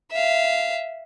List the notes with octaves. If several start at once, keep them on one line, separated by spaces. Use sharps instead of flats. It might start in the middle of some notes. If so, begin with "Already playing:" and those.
E5 F5